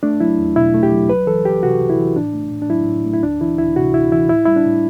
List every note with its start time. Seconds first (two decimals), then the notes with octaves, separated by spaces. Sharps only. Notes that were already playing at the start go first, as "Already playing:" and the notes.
0.03 A3 D4
0.20 F#3 E4
0.38 E2
0.56 B2 E4
0.74 A3
0.83 G4
0.92 F#3
1.09 C2 B4
1.27 E3 A4
1.45 C2 G4
1.63 C3 F#4
1.80 C2
1.90 E4
1.98 E3
2.16 A2 D4
2.34 A3
2.52 A2
2.62 D4
2.70 F#3 E4
2.87 A2
3.05 A3
3.14 E4
3.23 D2 D4
3.41 E3 E4
3.58 D2 E4
3.76 C3 F#4
3.94 D2 E4
4.12 E3 E4
4.29 A2 E4
4.45 G3 E4
4.56 D4
4.65 A2